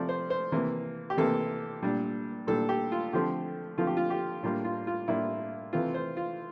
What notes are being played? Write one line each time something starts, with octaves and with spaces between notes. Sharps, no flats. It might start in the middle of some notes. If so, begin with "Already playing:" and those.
Already playing: C3 F3 A3 C4 D5
C5
C5
C3 E3 A#3
G4
C3 E3 A#3 A4
A#2 G3 D4
A#2 G3 D4 A4
G4
F4
D3 F3 A3 C4 G4
D3 F3 A3 C4 F4
G4
F4
G4
A2 G3 A#3 D4 F4
F4
F4
A2 G3 A#3 D4 E4
C3 E3 A3 C4 F4
C5
F4